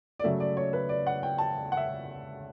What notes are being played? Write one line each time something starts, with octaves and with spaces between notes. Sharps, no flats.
D5
C#3 F#3 A3 E5
D5
C#5
B4
D5
F#5
G5
A5
F#5
E5